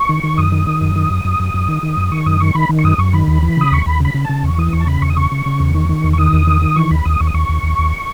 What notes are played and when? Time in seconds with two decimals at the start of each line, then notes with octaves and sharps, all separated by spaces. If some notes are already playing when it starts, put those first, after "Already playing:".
Already playing: C#6
0.09 D#3
0.23 D#3
0.38 F#2 D#6
0.52 D#3
0.67 D#3
0.81 F#2
0.96 D#3
1.10 F#2
1.25 F#2
1.40 F#2
1.54 F#2
1.68 D#3
1.83 D#3
1.97 F#2
2.12 D#3 C#6
2.26 F#2 D#6
2.40 D#3 C#6
2.55 D#3 B5
2.69 D#3
2.79 C#6
2.84 F#2 D#6
2.98 F#2 C#6
3.13 D#3 B5
3.27 D#2
3.43 E3
3.57 C#3 D#6
3.72 D#2 C#6
3.86 D#2 B5
4.00 C#3 B5
4.14 C#3
4.25 C#3 A5
4.44 E2 C#6
4.58 E3 D#6
4.73 E2 C#6
4.80 A5
4.87 C#3 B5
5.02 E2 C#6
5.10 D#6
5.17 C#3 C#6
5.32 C#3
5.46 C#3
5.60 E2
5.74 D#3
5.89 D#3
6.04 E2
6.13 C#6
6.18 D#3 D#6
6.33 E2
6.47 D#3
6.62 D#3
6.76 E3 C#6
6.91 D#2 B5
7.05 D#2 D#6
7.20 D#2 C#6
7.27 D#6
7.34 D#2 C#6
7.49 D#2
7.63 D#2
7.78 D#2